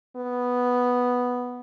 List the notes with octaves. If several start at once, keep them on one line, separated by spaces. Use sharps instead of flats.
B3